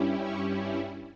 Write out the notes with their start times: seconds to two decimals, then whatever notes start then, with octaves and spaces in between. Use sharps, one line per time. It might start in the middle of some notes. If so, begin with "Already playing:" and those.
Already playing: G2 G3 C#4 E4
0.20 C#6